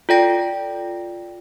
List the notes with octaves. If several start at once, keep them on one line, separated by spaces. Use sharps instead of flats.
F4 A4 D5 G5 A#6 D7